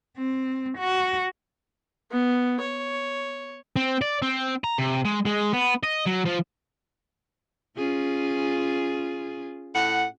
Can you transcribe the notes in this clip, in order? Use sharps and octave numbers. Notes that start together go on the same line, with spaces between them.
C4
F#4
B3
C#5
C4
D5
C4
A#5
C3
G#3
G#3
B3
D#5
F#3
F3
C#4 F4 G#4
A2 F#5